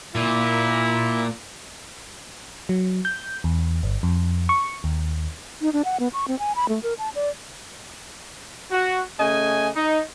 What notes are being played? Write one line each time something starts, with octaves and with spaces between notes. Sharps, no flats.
A#2 E4
F#3
G6
E2
G1
F2
C#6
D#2
D#4
D4
F#5
B3
C#6
C4
G#5
B5
A3
A#4
A5
D5
F#4
C#3 A3 D#5 G#5
D#4